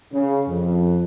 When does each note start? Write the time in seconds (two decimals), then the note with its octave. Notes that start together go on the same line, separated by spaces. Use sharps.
0.12 C#3
0.48 F2